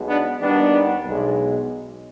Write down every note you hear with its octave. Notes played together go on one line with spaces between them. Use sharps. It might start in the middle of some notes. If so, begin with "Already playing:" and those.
Already playing: B1 B2 G#3
B3 D4
D#2 D#3 G3 B3 D4
B1 B2 G#3